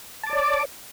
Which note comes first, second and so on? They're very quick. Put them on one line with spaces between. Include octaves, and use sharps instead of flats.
A5 D6 D5 C#5